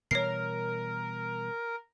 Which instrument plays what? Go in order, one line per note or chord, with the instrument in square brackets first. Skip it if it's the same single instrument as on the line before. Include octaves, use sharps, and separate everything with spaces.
[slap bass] B2 E3 G3 [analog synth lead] A#4 [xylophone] C#5 C7